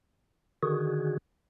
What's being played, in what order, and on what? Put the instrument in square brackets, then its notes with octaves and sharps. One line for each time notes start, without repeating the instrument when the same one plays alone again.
[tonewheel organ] D3 D#3 F#4 G#4